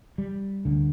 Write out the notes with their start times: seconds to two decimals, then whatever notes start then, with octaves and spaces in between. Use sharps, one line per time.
0.18 G3
0.65 D2 D3